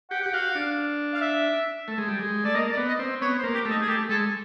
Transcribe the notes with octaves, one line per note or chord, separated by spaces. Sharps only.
G4 F#5
G4 F#5
F#4 F5
D4
F5
E5
A3
G#3
G3
G#3
A3 D5
A#3 D#5
D5
B3
D#5
C4
B3 C#5
C5
A#3
G4
A3 D#4
G#4
A3 G4
G#3 A4